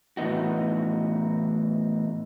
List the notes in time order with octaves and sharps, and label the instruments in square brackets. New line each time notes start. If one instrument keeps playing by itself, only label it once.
[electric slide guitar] A2 E3 B3 D#4 F#4